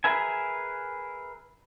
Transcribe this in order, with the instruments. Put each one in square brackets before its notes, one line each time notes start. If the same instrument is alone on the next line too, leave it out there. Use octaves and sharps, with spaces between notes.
[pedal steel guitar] G#4 A#4 B4 E5 G#5